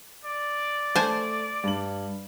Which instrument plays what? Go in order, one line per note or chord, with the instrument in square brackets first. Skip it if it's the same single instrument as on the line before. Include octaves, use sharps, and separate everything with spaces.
[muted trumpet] D5
[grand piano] A3 [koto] C5 G#5 A5
[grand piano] G2 F#7